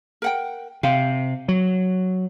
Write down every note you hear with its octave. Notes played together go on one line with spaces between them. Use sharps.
A#4 F#5 G5
C3 C5 F5 G5
F#3